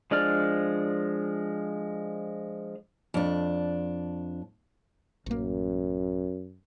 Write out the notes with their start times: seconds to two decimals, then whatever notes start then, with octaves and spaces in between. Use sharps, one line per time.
0.11 F3 G#3 D4 D5 F6
3.14 F2 D4
5.26 A1 F#2 A#3